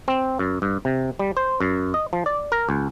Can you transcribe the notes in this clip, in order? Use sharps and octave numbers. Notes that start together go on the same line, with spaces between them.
C4
F#2
G2
C3
G3
C5
F#2
D#5
F3
D5
A#4
C#2